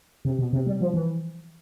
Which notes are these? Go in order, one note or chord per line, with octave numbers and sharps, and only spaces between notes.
C3
B2
C3
G3
F3
E3